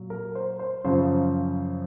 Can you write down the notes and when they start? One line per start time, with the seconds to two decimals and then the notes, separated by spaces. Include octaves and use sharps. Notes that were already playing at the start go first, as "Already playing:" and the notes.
Already playing: A#2 F#3
0.10 A#4
0.35 C5
0.59 C5
0.85 F#2 C#3 F3 C5